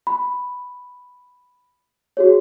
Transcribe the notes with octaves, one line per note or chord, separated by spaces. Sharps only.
B5
F#4 G#4 C#5